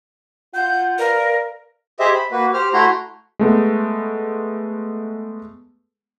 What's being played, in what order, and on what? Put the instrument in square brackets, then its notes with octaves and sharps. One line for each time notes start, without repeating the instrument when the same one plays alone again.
[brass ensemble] F4 F#5 [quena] G6
[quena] A#4 [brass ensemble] B4 D5 F5
[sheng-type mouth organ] G4 G#4 C5 D#5 E5
B5
A#3 F#4 B4
G4 C5 F6
A3 E4 F#4 A#5 C6
[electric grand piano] G#3 A3 B3